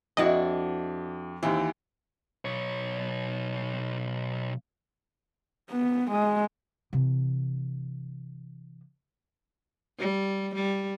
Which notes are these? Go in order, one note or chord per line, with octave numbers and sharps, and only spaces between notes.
F2 D4 E4 F#4 D#5
D#2 E3 C4
B1 C#5
B3
G#3
C3 E3
G3
G3